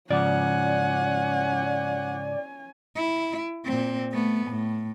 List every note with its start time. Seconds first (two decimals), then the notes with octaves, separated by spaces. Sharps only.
0.10 G#2 C#3 F3 C#4 D5 F#5 G#5
2.96 E4
3.65 A#2 C4
4.12 A3 B3
4.47 A2